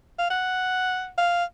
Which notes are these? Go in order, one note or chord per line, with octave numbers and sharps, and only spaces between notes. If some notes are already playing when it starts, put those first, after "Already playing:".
F5
F#5
F5